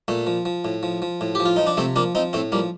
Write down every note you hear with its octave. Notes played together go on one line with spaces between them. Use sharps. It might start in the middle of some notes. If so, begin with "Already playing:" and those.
A#2 A3
F3
F3
A2
F3
F3
A2
F3 G4
F4
F3 D#4
D4
C3 A3 C4
F3 A#3 D4
F3 C4 D#4
A2 A3 C4
F3 G3 A#3